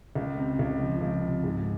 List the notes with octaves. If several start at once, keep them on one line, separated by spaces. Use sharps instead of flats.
C#2
C3
C#2
F3
C#2
C3
G#2